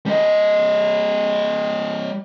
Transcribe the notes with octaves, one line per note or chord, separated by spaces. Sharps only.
G3 D#5